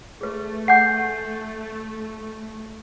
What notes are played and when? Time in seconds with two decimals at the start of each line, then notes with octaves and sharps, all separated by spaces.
0.21 A3 G#4 B4
0.68 F#5 G#5 D6 G6 C7